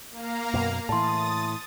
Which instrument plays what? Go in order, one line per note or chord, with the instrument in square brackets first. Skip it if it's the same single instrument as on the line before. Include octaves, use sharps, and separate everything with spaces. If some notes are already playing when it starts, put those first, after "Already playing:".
[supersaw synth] A#3 F5 A#5
[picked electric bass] F#2 B2
[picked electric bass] A2 E3 [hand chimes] A5 C6 [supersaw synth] D#6 A6